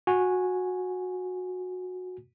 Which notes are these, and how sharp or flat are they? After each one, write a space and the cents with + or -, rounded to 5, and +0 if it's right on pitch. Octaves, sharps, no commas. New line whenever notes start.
F#4 -15 G#5 +0